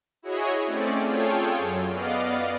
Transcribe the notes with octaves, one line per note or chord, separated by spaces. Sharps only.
E4 F#4 G#4 C#5 D#5
A3 C4 C#4 D5
F4 G#4 A4 C#5 G5
F#2
B3 D5 D#5 F5